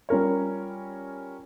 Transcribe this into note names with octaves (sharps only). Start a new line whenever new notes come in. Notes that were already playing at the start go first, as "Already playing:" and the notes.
G3 C#4 F4 A#4 C#5